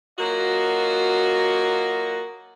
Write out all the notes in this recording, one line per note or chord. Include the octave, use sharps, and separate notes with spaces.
F#3 A#3 F4 F#4 D#5